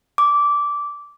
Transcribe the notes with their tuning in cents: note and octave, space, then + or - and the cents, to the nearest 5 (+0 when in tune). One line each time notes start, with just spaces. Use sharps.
D6 -15